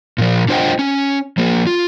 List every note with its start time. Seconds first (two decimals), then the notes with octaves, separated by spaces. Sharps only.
0.18 A#2 F3
0.49 D4 F4 C5 D#5 F#5 G5
0.79 C#4
1.38 F3 A#3
1.67 F4